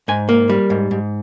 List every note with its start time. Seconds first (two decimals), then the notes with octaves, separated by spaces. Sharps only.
0.08 G#2 G#5
0.29 A#3
0.49 G3
0.70 G#2
0.91 G#2